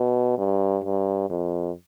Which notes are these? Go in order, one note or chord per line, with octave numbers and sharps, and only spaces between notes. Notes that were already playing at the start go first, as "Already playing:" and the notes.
Already playing: B2
G2
G2
F2